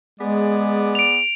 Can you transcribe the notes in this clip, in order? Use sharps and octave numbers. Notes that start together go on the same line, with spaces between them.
G#3 B3 G#4 D5
D7 F7